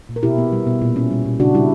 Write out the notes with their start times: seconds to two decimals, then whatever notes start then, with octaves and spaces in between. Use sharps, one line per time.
0.09 A#2
0.16 A#4
0.23 B2 E4 G4
0.38 B3
0.52 G3
0.67 B2
0.82 A#2
0.96 C#4
1.11 G3
1.25 A#2
1.40 C#3 D4 F#4
1.55 G3 E4